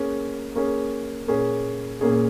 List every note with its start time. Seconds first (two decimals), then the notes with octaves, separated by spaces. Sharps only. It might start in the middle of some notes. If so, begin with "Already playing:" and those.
Already playing: A#3 C#4 G#4
0.55 A#3 C#4 G#4
1.28 A#2 A#3 C#4 G#4
2.01 A#2 A#3 C#4 G#4